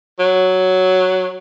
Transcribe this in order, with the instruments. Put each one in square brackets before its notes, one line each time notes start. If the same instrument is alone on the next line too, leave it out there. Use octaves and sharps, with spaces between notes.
[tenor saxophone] F#3